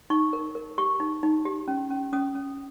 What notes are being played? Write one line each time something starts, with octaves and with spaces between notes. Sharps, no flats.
D#4 C#6
A#4
A#4
G4 C#6
D#4
D#4
G4
C#4
C#4
C#4 D#6
C#4